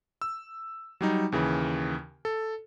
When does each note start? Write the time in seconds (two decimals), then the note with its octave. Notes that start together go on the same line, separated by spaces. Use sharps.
0.22 E6
1.01 F#3 G3 D#4
1.32 D#2 C#3 E3
2.25 A4